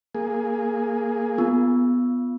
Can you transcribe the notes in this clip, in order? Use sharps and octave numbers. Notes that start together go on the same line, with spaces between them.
A#3 G#4
B3 F4